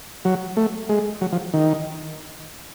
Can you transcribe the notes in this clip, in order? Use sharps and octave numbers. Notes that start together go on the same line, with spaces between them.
F#3
A3
G#3
F#3
F3
D#3